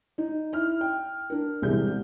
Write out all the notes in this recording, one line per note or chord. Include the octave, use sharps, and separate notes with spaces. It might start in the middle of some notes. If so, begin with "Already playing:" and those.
D#4
E4 F6
G5
D4 A#4
E1 C2 C3 G#4 G6